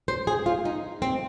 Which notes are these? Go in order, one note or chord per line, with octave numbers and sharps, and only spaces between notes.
C5
G#4
F4
D#4
C4